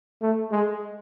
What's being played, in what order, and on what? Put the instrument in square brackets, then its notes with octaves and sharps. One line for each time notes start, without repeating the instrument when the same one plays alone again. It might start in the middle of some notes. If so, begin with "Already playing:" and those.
[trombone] A3
G#3